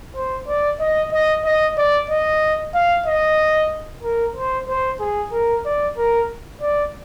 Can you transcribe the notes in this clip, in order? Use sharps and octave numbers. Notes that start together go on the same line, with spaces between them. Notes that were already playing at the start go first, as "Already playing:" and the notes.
C5
D5
D#5
D#5
D#5
D5
D#5
F5
D#5
A#4
C5
C5
G#4
A#4
D5
A#4
D5